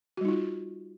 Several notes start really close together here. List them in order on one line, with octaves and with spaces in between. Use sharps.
F#4 G3 D#4 F4